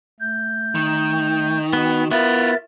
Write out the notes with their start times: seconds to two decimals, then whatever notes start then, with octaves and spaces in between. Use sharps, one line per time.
0.20 A3 G6
0.75 D#3
1.73 B3 F#4
2.11 B3 E4 F4 A#4 E5 A6